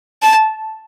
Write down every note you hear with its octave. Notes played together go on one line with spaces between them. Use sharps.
A5